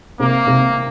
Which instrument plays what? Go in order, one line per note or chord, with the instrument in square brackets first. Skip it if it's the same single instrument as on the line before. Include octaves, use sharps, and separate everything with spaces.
[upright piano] C3 [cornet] A#3
[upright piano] C3